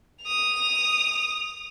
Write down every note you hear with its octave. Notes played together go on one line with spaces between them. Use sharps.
D#6 F7